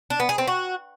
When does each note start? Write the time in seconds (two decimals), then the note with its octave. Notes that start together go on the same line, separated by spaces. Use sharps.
0.10 D4
0.20 B3
0.29 G#4
0.38 C4
0.47 F#4